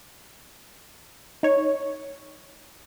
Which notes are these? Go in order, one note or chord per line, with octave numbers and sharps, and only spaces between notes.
D#4 C#5